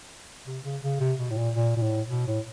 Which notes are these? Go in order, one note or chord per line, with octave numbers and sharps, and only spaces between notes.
C3
C#3
C#3
C3
B2
A2
A#2
A#2
A#2
A2
B2
A2